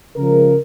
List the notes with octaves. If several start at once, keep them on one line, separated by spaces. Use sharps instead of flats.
C#3 F3 G#3 A#4